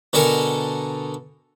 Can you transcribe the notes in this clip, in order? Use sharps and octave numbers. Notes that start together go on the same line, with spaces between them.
B2 D3 A4 A#4 G#5